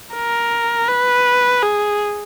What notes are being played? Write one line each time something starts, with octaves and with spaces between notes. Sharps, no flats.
A#4
B4
G#4